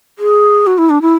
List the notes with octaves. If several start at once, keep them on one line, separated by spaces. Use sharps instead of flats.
G#4
F#4
E4
D4
E4